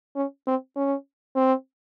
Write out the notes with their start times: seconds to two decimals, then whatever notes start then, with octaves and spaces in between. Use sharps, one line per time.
0.16 C#4
0.47 C4
0.76 C#4
1.36 C4